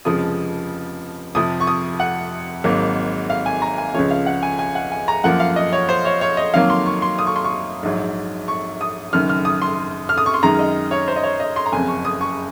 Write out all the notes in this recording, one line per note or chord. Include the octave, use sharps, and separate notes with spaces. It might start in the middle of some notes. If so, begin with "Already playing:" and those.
F1 F2 C#3 F3 G#3 D#6
F2 C3 F3 D#6
C#6
D#6
F#5
G#1 G#2 F#3 A#3
F5
G#5
A#5
G#5
C#2 C#3 F3 C#5
F5
F#5
G#5
G#5
F#5
G#5
A#5
F#2 F3 A#3 F#5
F5
D#5
C#5
C5
C#5
C#5
D#5
F2 D#3 F#3 A#3 F5
C6
C#6
C6
D#6
C#6
C6
C#6
A#1 G#2 F#3
C#6
D#6
F#1 F#2 D#3 F6
F6
D#6
C6
F6
D#6
C#6
C6
F#2 D#3 G#3 A#5
D#5
C#5
C5
D#5
C#5
D#5
C6
A#5
F#1 F2 C#3 G#5
C#6
D#6
C#6